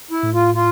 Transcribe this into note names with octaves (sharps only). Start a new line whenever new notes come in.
E4
A2
F4
F4